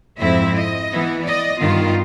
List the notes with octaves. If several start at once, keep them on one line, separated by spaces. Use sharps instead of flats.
F2 G#2 F3 C4 E4 E5
D#5
E3 B3 E4
D5 D#5
G2 D#3 B3 F4